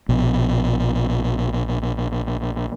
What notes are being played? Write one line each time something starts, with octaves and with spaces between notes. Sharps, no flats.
A#1 B2